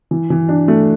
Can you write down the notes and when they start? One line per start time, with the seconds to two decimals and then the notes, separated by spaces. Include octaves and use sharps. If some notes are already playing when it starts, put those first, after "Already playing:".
0.11 E3
0.30 E3
0.49 D4
0.68 A3